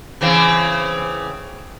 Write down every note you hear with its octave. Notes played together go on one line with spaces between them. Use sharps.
C#3 E3 C4